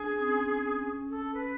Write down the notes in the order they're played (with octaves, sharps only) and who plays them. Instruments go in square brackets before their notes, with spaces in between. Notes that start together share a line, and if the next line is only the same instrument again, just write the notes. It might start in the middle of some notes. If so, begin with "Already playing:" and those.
Already playing: [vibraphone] D4 [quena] G#4
[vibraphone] C#4
C4
C#4
C#4
[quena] A4
B4